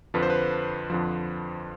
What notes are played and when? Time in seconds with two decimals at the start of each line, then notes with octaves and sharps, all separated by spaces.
0.14 F2 D3 F3 B4
0.22 C5
0.30 B4
0.90 F2 D3 F3